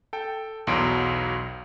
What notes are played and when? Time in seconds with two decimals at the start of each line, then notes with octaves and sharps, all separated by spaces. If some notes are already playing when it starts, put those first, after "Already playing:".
0.13 A4 G5
0.67 B1 E2 B2 F#3 C6 D7